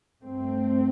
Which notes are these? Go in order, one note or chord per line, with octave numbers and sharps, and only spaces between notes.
G2 A3 C4